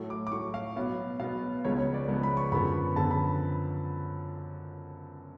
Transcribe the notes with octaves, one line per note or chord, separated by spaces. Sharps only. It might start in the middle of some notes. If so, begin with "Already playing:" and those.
Already playing: A2 F#3 A3
D6
D6
A2 F#3 A3 C#6
F5
B2 F#3 B3 F5
B2 F#3 B3 F5
C#2 C#3 F3 G#3 B3 C#5
C#5
D5
C#2 C#3 F3 G#3 B3
B5
C#6
F#2 D3 F3 B3 B5
F#2 D3 F3 B3 A5
B5